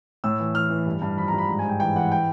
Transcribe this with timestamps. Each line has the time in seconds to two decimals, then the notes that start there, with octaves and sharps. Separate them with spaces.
0.24 A2 E6
0.39 E3
0.54 E3 F6
0.70 E3
0.86 G2
1.02 G2
1.17 F3 B5
1.28 A#5
1.33 G2
1.38 B5
1.48 G#2 A#5
1.59 G#5
1.65 G#2 G5
1.80 E3 G5
1.96 E3 F#5
2.12 G5